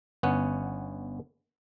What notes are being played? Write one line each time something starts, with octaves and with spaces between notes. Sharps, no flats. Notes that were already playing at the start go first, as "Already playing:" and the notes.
G1 B3 C#4 F#5